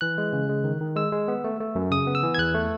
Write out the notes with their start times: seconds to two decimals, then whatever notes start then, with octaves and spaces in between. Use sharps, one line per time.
0.01 E3 F#6
0.18 G#3
0.33 C#3
0.49 G#3
0.64 D#3
0.81 D#3
0.96 G#3 E6
1.12 G#3
1.28 B3
1.44 A3
1.60 A3
1.75 F#2
1.91 C#3 D#6
2.07 B3
2.15 E6
2.23 E3
2.34 G#6
2.38 E2 F#6
2.54 A3